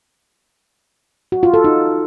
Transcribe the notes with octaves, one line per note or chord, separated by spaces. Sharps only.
F#4
F4
A4
D#4